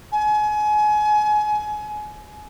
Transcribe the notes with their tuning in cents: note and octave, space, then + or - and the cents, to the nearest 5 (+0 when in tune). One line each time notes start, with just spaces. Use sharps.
G#5 +30